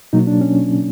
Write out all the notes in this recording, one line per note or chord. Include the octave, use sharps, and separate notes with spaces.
B2 F#3 A#3 D#4
D4
C#4